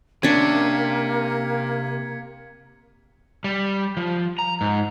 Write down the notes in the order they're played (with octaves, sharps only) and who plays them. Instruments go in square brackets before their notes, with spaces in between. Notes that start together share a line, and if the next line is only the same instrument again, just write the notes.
[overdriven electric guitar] C3 [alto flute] A#3 [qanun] C#4 D4 [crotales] G#6 B6 C#7
[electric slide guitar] G3
F3
A#5
G#2